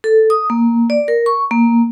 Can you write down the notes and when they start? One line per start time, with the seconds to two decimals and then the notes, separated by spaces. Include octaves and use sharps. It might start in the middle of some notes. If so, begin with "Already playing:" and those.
0.04 A4
0.30 D#6
0.50 A#3
0.90 D5
1.08 A#4
1.26 C#6
1.51 A#3